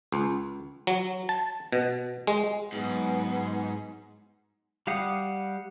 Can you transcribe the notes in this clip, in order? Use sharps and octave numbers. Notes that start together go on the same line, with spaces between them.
C#2
F#3
A5
B2
G#3
G#2 F#3 B3
G3 G4 F5 F#5 D#6